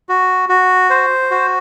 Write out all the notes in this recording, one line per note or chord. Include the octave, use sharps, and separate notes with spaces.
F#4
F#4
C5
F#4